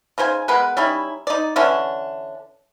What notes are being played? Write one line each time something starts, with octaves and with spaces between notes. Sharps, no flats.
C#3 D#4 C5 G#5
G#3 B3 A#4 B4
G3 C#4 D#4 E4
D#4 D5
D3 E3 C#4 D4